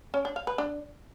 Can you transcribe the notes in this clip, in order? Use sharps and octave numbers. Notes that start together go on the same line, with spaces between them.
C#4
D4
F5
B4
D4